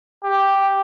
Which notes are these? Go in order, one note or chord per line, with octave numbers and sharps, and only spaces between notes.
G4